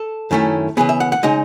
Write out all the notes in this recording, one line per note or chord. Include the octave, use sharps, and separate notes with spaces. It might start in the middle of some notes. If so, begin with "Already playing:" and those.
Already playing: A4
F#2 D#3 A3 C#4 E4
C#3 E3 B3 G#4
E5
F#5
F#5
C#3 G#3 D#4 D#5